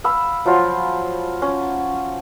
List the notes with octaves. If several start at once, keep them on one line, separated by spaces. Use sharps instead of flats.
F5 B5 E6
F3 F#3 F4
C#4